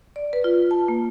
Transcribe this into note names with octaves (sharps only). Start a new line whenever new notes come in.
D5
B4
F4
A5
A#3